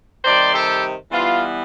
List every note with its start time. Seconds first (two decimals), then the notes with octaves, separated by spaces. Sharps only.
0.25 C3 D#3 G3 C5 D5
0.54 G4 A4
1.12 E3 G3 B3 F4